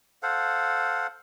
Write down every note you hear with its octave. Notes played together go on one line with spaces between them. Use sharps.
A4 C5 F5 F#5